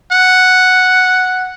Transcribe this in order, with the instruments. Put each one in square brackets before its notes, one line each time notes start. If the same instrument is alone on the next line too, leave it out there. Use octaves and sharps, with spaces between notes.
[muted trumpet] F#5